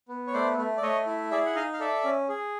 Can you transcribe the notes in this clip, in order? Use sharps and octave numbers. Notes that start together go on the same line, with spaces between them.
B3
C#5
A3 C5 D5
A3
D5
A3 C#5 D#5
E4
G#4 D5 E5
F#5
D#4 D#5 F5
F5
A4 D5 E5
C#4
G#4